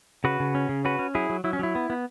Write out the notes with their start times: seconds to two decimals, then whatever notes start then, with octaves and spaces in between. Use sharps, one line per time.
0.24 C#3 F#4 B4
0.40 C#3
0.55 C#4
0.69 C#3
0.85 C#4 F#4 B4
0.99 C#4
1.15 F#3 E4 G#4
1.30 F#3
1.44 F#3 E4
1.53 C#4
1.59 F#3 E4
1.75 B3
1.90 B3